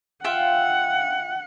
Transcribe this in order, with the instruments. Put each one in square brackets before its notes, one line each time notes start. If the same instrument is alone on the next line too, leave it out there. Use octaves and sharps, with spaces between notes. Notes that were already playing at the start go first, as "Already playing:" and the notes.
[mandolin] F4 E5 G5 [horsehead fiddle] F#5